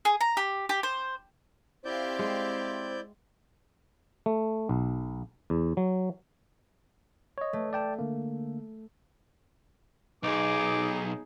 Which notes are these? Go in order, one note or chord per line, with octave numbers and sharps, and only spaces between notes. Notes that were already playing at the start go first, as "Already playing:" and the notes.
G#4
A#5
G4
G4
C5
C4 E4 G4 C5 D5 E5 F5 G6
G#3
A3
B1
E2
F#3
C#5 D#5
A3
D5 G5 A5
D3 A#3
B1 D#4 G#4 D6